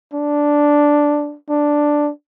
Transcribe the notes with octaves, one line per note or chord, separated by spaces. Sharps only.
D4
D4